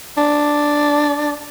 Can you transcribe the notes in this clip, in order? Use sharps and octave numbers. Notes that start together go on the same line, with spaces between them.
D4